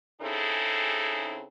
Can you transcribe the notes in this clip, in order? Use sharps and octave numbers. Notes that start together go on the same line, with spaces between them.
C#3 C4 D#4 E4 G#4 A4